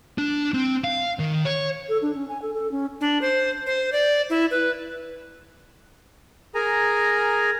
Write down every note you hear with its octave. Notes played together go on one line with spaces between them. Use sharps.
D4
C4
F5
D#3
C#5
A4
D4
C#4
G#5
A4
A4
C#4
D4
C5
C5
D5
E4
B4
G#4 A#4 G#5 A#5